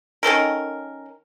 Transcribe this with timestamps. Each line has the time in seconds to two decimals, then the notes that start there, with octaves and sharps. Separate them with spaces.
0.23 D#3 C#4 A4 A#4